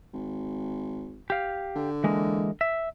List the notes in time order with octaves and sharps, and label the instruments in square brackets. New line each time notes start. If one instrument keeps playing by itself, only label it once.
[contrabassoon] G#1
[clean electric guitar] G4 F5
[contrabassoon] D3
[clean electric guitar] E3 G#3 A#3
E5